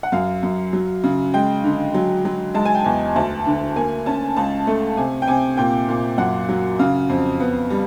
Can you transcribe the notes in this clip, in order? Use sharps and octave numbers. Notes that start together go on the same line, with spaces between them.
F#5
F#2 F5
F#2
F#3
C#3
G#3 G5
D3
F#3
F#3
G#3 A5
G#5
G5
E2 G#5
D2 A5
D3
A#3 G#5
C#4 A5
C#2 A5
A3
C3 G#5
G5
C3 G#5
A#2 G5
A#2
F#2 F#5
F#3
C#3 F5
F2
B3
G3